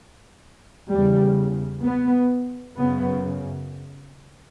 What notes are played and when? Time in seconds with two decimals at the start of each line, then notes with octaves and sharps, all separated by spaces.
0.91 E2 C#3 G3
1.83 B3
2.75 F#2 C#3 B3